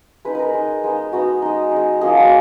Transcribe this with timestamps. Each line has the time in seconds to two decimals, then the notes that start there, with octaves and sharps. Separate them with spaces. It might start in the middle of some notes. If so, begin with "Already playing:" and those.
0.25 G#3 D#4 B4
0.35 A#4 B4
0.54 G#3 D#4
0.84 G#3 B3 D#4
1.12 G#3 B3 D#4 F#4
1.42 G#3 D#4
1.72 G#3 D#4
2.01 F3 A#3 D#4 G#4
2.17 F#4